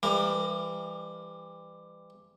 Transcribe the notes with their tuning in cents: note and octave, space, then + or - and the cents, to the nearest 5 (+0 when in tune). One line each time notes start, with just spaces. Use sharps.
E3 +35 G3 +40 A#4 +0